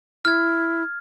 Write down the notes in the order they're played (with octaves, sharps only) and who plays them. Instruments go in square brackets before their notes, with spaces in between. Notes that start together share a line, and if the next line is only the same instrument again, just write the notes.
[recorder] E4 [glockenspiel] F6 G#6